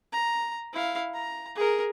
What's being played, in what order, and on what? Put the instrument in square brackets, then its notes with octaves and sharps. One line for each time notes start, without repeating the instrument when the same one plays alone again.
[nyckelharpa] A#5
E4 F5
A#5
G#4 A#4